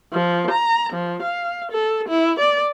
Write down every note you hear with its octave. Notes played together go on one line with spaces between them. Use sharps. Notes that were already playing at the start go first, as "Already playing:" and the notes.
F3
A#5
F3
F5
A4
E4
D5